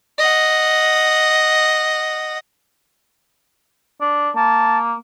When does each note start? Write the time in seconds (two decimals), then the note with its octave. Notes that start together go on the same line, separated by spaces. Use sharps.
0.19 D#5 F#5
4.01 D4
4.36 A#3 A5